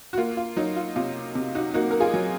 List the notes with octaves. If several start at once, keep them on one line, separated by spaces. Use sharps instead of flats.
F#4
A#3 F4
F4
F#3 D#4
F4
C3 F4
C3
D#4 F#4
A#3 D#4 F#4
A#4
F4 G#4
F#3